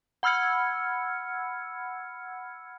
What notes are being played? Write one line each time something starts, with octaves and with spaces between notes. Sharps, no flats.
F#5 B5 E6 F6 G#6 C#7